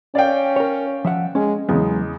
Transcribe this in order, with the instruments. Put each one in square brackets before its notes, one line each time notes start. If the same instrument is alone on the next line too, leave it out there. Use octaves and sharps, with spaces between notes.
[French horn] C#4 [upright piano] D5 F5 G5
[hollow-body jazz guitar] A#4 C#5
F3 E5 F#5
[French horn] G#3 [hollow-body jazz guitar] C#4
[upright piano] E2 C#3 [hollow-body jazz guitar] F#3 B3 [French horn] G#3